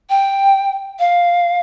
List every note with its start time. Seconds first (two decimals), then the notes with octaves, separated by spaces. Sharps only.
0.10 G5
0.99 F5